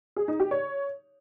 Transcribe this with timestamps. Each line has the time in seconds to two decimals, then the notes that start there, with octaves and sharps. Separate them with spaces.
0.16 G#4
0.28 D#4
0.40 G4
0.51 C#5